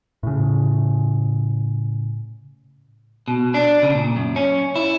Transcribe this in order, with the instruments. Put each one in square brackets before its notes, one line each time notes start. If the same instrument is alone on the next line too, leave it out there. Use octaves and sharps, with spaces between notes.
[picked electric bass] A2 C#3
[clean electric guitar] B2
D4
C#3
A#2
F#2
C#4
E4